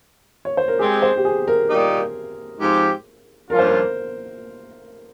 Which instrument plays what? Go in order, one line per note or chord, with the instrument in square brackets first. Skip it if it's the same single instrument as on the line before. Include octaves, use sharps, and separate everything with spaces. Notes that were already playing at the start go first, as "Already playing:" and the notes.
[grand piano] C#5
C5
A#4
[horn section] G#3 C4 G4 [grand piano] G#4
[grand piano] C5
G4
G#4
A#4
[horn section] A#2 G3 A#3 D#4 G4
G#2 F3 C4 G4
[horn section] G2 F3 A#3 C#4 F4 [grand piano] A#4
[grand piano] C5
A#4